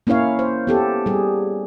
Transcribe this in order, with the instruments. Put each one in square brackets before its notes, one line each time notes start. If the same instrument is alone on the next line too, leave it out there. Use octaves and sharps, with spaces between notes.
[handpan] A#3 C#4 E4 C#5 F5
C5
B3 G4 A4
G3 G#4